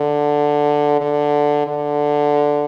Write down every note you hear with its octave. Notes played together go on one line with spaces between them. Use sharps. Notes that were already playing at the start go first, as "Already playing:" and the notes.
Already playing: D3
D3
D3